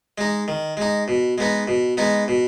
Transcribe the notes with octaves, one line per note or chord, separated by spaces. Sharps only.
G#3 D#4
D#3
G#3 D#4
B2
G#3 B3 D#4
B2
G#3 B3 D#4
B2